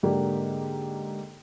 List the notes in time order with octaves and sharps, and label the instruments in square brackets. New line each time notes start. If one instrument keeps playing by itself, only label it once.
[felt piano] G#2 D3 A#3 G4